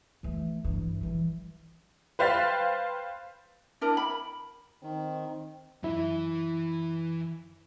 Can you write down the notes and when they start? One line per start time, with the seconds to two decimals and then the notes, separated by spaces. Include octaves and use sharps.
0.23 E3 A3
0.64 G2 E3
1.01 E3 G3
2.19 B4 C5 F5 G5 A6 B6
3.81 D4 E4 A#4
3.97 B5
4.83 D#3 C4
5.83 F#2 E3 E4 E5